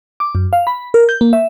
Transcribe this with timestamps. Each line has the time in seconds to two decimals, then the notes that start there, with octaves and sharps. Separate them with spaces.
0.20 D6
0.35 F#2
0.53 F5
0.67 B5
0.94 A#4
1.09 G6
1.21 A#3
1.33 E5